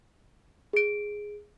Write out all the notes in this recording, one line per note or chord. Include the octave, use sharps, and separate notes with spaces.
G#4 D7